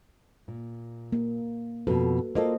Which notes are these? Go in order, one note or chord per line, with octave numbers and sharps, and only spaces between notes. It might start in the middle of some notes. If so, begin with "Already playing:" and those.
A#2
A#3
F2 B2 F#4 A4 B4
A#3 F4 A4 C5 D#5